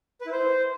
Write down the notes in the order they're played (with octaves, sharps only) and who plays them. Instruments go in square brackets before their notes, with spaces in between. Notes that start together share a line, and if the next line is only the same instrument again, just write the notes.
[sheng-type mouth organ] B4
E4
C5